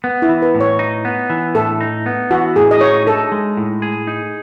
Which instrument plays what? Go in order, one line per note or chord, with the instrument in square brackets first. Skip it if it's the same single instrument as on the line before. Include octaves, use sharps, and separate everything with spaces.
[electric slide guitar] B3
[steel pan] E4
[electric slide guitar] E3
[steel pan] B4
[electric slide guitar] A2
[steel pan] C#5
[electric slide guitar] D#4
B3
E3
[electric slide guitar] A2 [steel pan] A4
[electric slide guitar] D#4
B3
[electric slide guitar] E3 [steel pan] F#4
[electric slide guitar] A2 [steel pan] G#4
[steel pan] D#5
[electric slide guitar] D#4 [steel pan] C#5
[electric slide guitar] D#4 [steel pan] A4
[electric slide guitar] G#3
A2
G#4
D#4